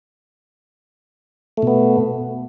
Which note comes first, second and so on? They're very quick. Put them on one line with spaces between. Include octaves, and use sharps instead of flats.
A3 B2 B3